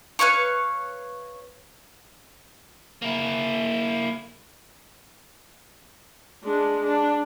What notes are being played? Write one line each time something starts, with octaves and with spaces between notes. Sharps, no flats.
B4 C#5 F5 C#6
A#3 E4
G#3 D4
D4